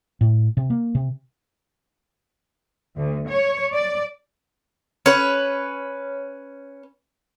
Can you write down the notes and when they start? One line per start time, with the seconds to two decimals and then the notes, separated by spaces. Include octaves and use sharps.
0.21 A2
0.57 C3
0.70 A#3
0.95 C3
2.96 D2
3.28 C#5
3.72 D5
5.06 C#4 B4